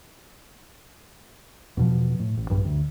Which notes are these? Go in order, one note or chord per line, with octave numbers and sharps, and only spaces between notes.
E2 B2 F3
A2
A1
A#1 G2
D2